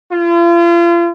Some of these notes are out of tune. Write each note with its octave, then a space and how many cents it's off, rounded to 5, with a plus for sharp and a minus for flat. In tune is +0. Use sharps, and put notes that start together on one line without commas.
F4 -40